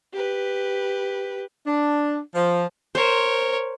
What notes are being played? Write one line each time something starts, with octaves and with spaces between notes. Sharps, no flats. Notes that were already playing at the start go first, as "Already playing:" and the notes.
G4 B4
D4
F3
A#4 C5 C#5